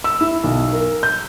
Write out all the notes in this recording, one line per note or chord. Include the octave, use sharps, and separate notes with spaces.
E6
E4
B1
A#4
G6